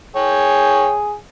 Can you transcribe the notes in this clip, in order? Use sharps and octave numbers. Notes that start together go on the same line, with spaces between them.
G#4 C#5 G5